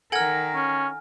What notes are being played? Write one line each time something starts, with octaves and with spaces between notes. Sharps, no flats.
D#3 A4 A#4 F#5 G#5 F6 G#6
C#4